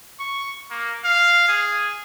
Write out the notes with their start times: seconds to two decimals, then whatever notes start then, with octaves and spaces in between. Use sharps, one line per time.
0.20 C#6
0.71 A#3
1.04 F5
1.49 G#4